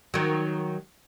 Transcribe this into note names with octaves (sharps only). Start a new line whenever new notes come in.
D#3 F#3